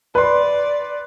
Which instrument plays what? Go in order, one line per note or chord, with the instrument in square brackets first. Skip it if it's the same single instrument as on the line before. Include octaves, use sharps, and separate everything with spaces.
[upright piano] B4 C6 [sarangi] D5